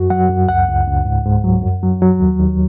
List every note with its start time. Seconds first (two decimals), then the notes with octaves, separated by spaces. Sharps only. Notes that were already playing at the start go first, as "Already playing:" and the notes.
Already playing: F#2 F#4
0.10 F#3 F#5
0.29 F#2
0.48 C#2 F#5
0.68 C#2
0.87 C#2
1.05 G#2
1.25 G#2
1.44 F#3
1.63 F#2
1.83 F#3
2.02 F#3
2.20 D#2
2.40 D#2